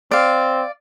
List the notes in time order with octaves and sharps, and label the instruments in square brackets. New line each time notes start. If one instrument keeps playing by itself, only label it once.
[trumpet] C4 [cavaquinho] D5 F5